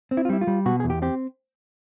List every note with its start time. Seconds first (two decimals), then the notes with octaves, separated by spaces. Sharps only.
0.11 C4
0.17 E4
0.25 F4
0.29 G3 E4
0.41 F4
0.47 G3
0.66 B2 F#4
0.80 E2 G#4
0.90 G4
1.02 C4 G4